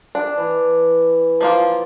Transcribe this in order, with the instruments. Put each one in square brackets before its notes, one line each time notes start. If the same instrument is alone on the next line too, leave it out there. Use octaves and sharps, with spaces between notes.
[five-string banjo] D4
[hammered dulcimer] E3
[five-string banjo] F3 A#3 F4